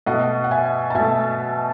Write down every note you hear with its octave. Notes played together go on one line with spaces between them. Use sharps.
B2 A3 D#5 F#5
F#5
E5 G#5
A5
B2 A3 E5 G#5